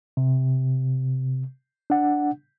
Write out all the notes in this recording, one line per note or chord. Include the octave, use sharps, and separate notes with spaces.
C3
D4 F#5